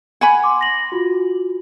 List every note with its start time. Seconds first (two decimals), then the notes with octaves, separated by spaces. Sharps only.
0.21 F#5 G#5 B5 G#6
0.44 C6 D6
0.61 A#6 F#7
0.92 F4 F#4